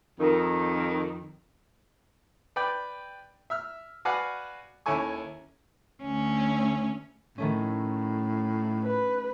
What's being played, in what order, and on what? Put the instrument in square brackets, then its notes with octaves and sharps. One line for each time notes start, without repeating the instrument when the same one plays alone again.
[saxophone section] F2 D#3
[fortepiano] B4 D5 G5
E5 E6 F6
F#4 B4 D5 F5 F#5 G#5
D#2 C#4 E4 A4 G#5 C#6
[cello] D2 C#4
[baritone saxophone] A2 [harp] D#3 A3 C#4
[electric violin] B4